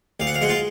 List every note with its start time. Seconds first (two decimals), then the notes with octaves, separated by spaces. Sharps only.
0.20 D2 F5
0.27 F#5
0.34 F5
0.41 G#3 F#5
0.49 F4 F5